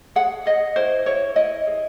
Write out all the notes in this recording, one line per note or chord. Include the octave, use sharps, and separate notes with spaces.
G#4 F#5
G#4 D#5
E4 C5
E4 C#5
E4 D#5
G#4